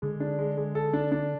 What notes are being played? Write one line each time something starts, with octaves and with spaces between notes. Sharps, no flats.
D3 G#3
D4
G#3
G#3
A4
D4
D4